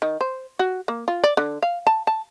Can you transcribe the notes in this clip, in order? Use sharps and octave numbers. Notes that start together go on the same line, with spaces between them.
D#3
C5
F#4
A#3
F4
D5
D3
F5
A5
A5